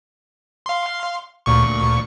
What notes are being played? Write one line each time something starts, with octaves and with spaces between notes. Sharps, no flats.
F5 C6
D2 A#2 C#6